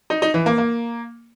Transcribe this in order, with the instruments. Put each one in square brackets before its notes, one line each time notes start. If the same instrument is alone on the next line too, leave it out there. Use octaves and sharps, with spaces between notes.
[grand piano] D#4
D#4
E3
A#3
A#3